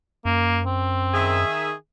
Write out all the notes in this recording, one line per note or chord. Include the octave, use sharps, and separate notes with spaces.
F#2 A#3
C4
D#3 G#4 E5